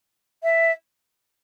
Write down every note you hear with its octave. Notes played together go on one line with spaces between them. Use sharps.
E5